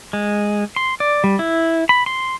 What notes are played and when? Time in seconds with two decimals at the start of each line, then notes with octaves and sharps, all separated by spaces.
0.13 G#3
0.76 C6
1.00 D5
1.24 G3
1.39 E4
1.89 B5
2.06 C6